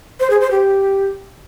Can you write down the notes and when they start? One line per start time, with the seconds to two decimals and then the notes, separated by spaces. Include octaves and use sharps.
0.20 C5
0.30 G#4
0.41 C5
0.51 G4